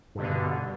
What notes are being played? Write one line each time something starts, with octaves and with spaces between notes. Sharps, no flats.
G2 B2 D3